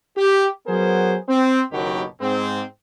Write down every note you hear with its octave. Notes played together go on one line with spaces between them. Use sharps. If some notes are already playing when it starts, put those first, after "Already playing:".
G4
F#3 B3 G#4 A#4 C5
C4
F#1 D#2 B2 D#3 F#3 G4
G#2 C4